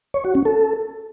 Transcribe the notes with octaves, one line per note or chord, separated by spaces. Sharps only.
C#5
F#4
C#4
A4